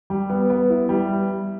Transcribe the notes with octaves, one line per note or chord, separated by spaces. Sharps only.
G3
B3
B3
E4
G3